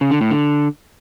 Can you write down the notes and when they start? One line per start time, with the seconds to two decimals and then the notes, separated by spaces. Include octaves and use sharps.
0.01 C#3
0.11 D3
0.21 A2
0.31 D3